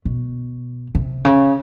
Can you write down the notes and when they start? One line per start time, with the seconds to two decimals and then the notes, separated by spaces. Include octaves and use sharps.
0.05 B2
0.95 C3
1.25 C#3